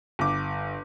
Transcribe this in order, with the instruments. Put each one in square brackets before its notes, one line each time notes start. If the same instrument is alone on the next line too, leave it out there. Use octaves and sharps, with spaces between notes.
[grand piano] G1 D6